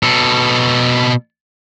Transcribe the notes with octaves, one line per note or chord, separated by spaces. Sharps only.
B2 A4